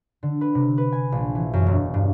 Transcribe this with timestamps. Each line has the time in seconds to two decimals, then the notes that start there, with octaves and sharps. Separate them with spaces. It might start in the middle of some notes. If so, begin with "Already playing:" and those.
0.23 D3
0.41 B4
0.55 C3
0.77 B4
0.92 G#5
1.12 A#1
1.35 E3
1.53 F#2
1.66 E1
1.94 G2